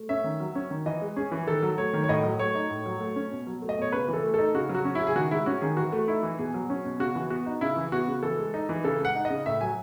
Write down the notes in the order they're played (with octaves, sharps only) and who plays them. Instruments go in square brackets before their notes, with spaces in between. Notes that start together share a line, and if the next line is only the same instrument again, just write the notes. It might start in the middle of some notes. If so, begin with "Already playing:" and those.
Already playing: [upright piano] A3
C#4 E5
D#3
F#3
C#4
D#3
E3 D#5
G#3
C#4 G#4
E3
D#3 A4
F#3
A3 C#5
D#3
C#5
A2 D#5
F#3
A3 C#5
D#4
A2
F#3
A3
C#4
B2
F#3
A3
D#5
B2 C#5
C#3 B4
E3
A4
A3
D#4 A4
C#3 F#4
F#3
F#4
C#4
E4
C#3
G#4
D#3 F#4
G#3 E4
C#4 F#4
D#3 G#4
E3 F#4
A3
D#4 E4
E3
B2 G#4
F#3
C#4
B2
C#3 F#4
E3
B3 F#4
D#4
C#3 E4
E3
B3 F#4
C#3
E3 A4
G#3
D#4
E3
C#3 A4
G#3 F#5
D#4
D#5
C#3
A2 E5
F#3 G#5